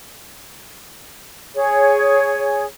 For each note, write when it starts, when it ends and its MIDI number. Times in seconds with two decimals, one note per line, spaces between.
1.55 2.65 68
1.55 2.65 73